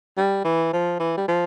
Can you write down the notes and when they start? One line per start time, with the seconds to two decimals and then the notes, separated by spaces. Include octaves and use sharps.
0.17 G3
0.45 E3
0.73 F3
1.00 E3
1.18 G3
1.28 F3